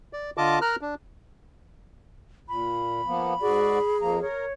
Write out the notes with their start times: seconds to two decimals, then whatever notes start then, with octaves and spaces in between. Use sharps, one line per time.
0.13 D5
0.37 D3 F4 D#5 A5 D6
0.62 A#4 A#5 F6 F#6
0.81 D4
2.49 A#2 B5
3.06 F3 A#3 B3
3.41 G#2 F#4 G#4 D5
4.01 F2 F3 A#3 A#5
4.22 A#4 C#5